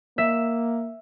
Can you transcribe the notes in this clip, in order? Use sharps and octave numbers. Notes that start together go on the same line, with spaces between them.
A#3 E5